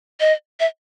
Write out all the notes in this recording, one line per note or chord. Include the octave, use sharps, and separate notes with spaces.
D#5
E5